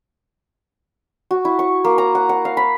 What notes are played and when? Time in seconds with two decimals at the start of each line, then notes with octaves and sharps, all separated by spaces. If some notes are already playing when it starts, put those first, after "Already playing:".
1.31 F#4
1.45 E4
1.59 C#6
1.85 A#3
1.98 A#5
2.15 F#5
2.29 F#5
2.45 F5
2.57 B5